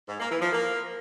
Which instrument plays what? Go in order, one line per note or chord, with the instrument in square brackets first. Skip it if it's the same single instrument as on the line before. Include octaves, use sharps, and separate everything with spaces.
[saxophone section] G#2
A#3
E3
F3
A#3